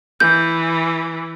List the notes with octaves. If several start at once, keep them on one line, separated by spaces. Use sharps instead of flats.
E3 G6